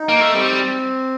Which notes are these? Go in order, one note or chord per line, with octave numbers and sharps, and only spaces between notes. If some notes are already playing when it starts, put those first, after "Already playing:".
Already playing: D#4
A#3
A3
G3 C4